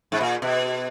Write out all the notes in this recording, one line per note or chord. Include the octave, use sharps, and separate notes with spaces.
G#2
A#2
B2